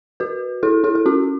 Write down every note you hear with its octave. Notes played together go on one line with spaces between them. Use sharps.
F#4 B4
E4 A4
E4 A4
A4
C#4 F#4